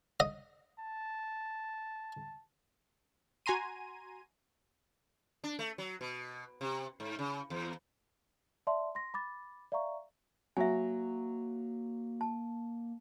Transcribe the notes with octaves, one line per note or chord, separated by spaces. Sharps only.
D#5
A5
F#4 G#5 A#5 C6 D#7
D4
A3
F#3
B2
C3
G#2
C#3
E2
D5 E5 A5 C6
C6 A#6
B5 D6 A6
D5 E5 F5 A#5 C#6
F#3 A#3 E5 G#5
A5